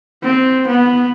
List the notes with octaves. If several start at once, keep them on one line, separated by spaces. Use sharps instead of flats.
C4
B3